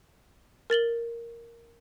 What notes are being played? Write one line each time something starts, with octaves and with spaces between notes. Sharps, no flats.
A#4 A6 F#7 G7